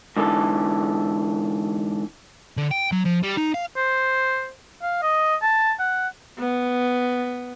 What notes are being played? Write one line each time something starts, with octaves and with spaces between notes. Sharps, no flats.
G#2 D3 E3 A4
D3
G5
F#3
F3
G3
D#4
F5
C5
F5
D#5
A5
F#5
B3